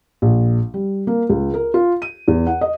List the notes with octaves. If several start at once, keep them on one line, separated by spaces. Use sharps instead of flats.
A#1
G3
A#3
C#2
A#4
F4
D#7
E2
F#5
D#5